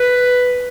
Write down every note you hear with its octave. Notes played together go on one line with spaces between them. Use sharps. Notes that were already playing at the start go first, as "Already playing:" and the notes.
Already playing: B4